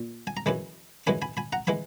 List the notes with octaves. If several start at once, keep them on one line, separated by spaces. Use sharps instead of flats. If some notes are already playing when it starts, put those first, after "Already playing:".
Already playing: A#2
G#5
A#5
F#2 E3 G#3 G#5 B5
F#2 E3 G#3 G#5 B5
G#5 B5
G#5 B5
F#5 A#5
E3 G#3 G#5 B5